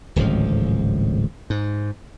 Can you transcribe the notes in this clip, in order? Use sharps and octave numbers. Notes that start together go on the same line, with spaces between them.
D1 G#1 C#2 F3
G#2